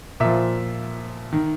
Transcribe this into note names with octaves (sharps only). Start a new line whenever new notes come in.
A#2 F3 E5
D#3